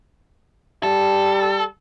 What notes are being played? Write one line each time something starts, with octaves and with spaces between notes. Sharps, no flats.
G3 A4